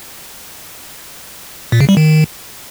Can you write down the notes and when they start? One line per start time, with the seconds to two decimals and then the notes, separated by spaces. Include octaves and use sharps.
1.72 A#2
1.81 C#3
1.89 G3
1.97 D#3